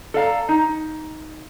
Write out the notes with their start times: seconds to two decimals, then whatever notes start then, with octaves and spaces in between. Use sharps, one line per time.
0.14 A4 D5 F5 A#5
0.49 D#4